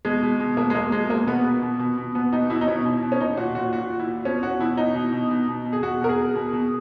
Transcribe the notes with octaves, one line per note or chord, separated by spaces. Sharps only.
B2 G#3
B2
B2
B2 A#3
G#3
B2 A#3
B2 G#3
B2 A#3
B2 B3
B2
B2
B2
B2
B2 B3
B2 D#4
B2 E4
D#4
B2 C#4
B2
B2
C#4
A#2 D#4
A#2 F#4
A#2 F#4
A#2 F#4
A#2
E4
A#2
B2 C#4
B2 F#4
B2 E4
B2 D#4
B2
B2
B2
B2
B2
G#4
B2 F#4
B2 A#4
G#4
B2
B2
B2